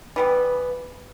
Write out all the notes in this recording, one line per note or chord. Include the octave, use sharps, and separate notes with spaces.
E3 G3 B3